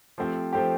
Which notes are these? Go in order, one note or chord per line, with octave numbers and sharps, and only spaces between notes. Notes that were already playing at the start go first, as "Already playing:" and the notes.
F3 A3 C4 G4
F3 A3 C4 G4